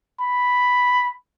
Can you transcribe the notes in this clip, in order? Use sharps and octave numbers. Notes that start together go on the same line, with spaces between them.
B5